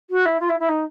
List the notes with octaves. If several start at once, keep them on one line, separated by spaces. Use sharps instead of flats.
F#4
E4
F4
E4
E4
D#4